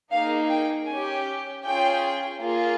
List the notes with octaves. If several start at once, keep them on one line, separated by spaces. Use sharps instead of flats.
A#3 D#4 G#4 F5
G5
C#4 G4 G#5
C#4 F4 G#4 G5
A#3 F4 G#4